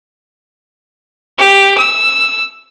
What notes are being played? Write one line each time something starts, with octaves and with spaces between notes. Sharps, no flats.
G4
E6